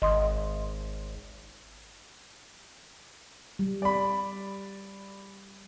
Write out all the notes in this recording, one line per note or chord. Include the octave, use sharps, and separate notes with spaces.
G#1 D#5 C6 D#6
G3
D5 B5